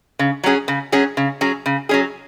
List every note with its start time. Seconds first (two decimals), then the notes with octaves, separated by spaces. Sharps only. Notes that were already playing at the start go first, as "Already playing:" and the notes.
0.19 C#3
0.44 F#3 C#4 G#4
0.68 C#3
0.92 F#3 C#4 G#4
1.17 C#3
1.41 F#3 C#4 G#4
1.66 C#3
1.89 F#3 C#4 G#4